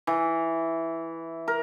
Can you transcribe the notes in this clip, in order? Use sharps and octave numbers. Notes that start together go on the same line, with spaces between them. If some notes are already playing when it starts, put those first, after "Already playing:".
E3
A#4